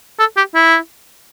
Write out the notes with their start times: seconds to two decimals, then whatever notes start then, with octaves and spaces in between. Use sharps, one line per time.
0.19 A4
0.37 G4
0.55 E4